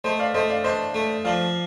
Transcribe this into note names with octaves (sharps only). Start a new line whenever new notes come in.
A3 C5 D#5
D5 F5
A3 C5 D#5
D5 F5
D4 C5 D#5
A3
F3 D5 F5